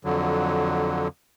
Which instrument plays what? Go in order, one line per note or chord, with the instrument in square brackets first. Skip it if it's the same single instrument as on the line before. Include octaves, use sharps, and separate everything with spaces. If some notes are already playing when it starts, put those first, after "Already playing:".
[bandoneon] F2 D3 F#3